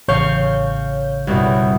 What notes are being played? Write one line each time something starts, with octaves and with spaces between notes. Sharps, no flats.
A1 C#3 C#5 F5 C#6 G6
C2 G2 B2